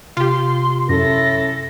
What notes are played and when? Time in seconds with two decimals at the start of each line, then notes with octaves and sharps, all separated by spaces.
0.17 C3 F4 G4 C6
0.89 F#2 C#4 E4 A4 A#6